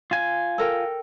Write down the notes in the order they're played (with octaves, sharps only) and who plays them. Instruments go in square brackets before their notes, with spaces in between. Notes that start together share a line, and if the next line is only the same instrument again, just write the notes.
[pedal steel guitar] F4 G#5
[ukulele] A4 A#4 G5